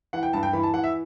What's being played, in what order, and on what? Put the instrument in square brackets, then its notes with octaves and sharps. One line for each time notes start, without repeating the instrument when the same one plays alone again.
[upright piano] E3 F#5
G5
G2 A5
G5
E3 B5
A5
E3 F#5
E5